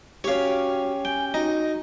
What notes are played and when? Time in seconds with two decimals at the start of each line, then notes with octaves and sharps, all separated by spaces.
0.24 C#4 F#4 G4 C#5 F5
1.05 G5 G#5
1.34 D#4 F#4